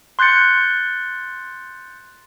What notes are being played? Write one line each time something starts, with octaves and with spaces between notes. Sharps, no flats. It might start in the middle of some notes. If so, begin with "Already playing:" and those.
C6 F#6 G6 A6 C#7